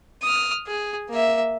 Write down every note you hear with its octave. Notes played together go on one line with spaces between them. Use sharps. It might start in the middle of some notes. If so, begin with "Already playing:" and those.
D#6 F6
G#4
A#3 E5